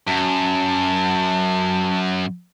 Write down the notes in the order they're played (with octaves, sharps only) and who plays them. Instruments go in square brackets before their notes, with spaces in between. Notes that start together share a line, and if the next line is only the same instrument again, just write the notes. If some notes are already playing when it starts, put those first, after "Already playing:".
[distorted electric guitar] F#2 [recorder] A5